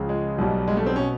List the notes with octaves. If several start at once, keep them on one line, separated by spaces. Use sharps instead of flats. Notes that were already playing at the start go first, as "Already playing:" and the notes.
Already playing: C#2 C#3 F3
G#3
B1 B2 G3
G#3
A3
C4
B2 C#4